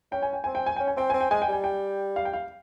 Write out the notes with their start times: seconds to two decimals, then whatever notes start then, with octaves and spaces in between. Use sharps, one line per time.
0.12 C#4 G5
0.22 G#5
0.33 G5
0.44 C4 G#5
0.55 G5
0.66 G#5
0.76 C#4 G5
0.87 G#5
0.97 C4 G5
1.10 C4 G#5
1.21 G5
1.31 G#3 G#5
1.42 G5
1.49 G3 G#5
1.64 G5
2.16 F5
2.25 G5
2.33 F5